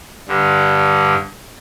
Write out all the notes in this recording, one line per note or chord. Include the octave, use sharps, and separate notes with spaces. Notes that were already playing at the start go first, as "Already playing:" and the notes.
G2 D3